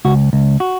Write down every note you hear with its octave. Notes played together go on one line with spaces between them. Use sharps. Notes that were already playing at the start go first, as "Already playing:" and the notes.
C#2 F#4
C#2
F#4